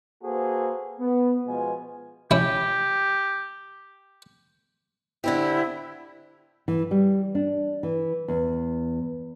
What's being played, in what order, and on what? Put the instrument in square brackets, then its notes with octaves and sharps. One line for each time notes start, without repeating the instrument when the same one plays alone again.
[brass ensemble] A#3 F#4 G#4 A4 B4 C5
B3
B2 F3 G#3 F4 B4 G#5
[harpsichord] C#4 E4 [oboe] G4
[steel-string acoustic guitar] D3 C4 G4 [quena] E4
[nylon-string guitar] E3
G3
D4
E3
E2